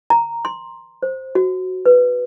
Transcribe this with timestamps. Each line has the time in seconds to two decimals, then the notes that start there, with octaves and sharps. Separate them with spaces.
0.10 A#5
0.45 C6
1.03 C5
1.35 F#4
1.86 B4